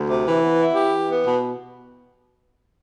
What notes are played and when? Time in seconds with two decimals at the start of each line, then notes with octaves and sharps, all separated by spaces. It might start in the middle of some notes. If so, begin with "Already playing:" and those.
Already playing: D2
0.10 C3
0.26 E3
0.42 B3
0.60 E4
0.75 G4
0.92 E3
1.09 B3
1.25 B2